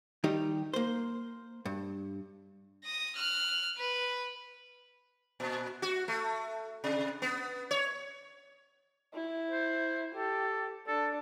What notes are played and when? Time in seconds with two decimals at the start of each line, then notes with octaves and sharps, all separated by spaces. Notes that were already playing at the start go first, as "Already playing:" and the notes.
0.24 D#3 G3 D#4 G4
0.73 A#3 C5
1.65 G2
2.84 D#6 A#6
3.16 F6 F#6
3.77 B4
5.40 A#2
5.82 F#4
6.08 A3
6.84 C3
7.22 B3
7.71 C#5
9.14 E4
9.50 C5
10.15 G4 A4
10.87 D4 A4